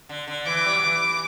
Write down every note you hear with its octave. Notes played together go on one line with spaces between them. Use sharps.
D3
D3
E3 D6
G3
F#3
E3